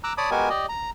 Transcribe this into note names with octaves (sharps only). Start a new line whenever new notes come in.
A#5 D6 E6 F#6
C#5 D5 A5 B5 D6 D#6
G#3 B3 F#4 G4 A#4 G#5
G4 D5 D#5
A#5